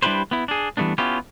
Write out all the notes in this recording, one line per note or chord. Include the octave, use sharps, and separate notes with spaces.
G3 D4 E4 G4 B4 C5
B3 E4
D4 G#4
E3 G3 A3 B3 D4
B3 C#4 E4 F4 G4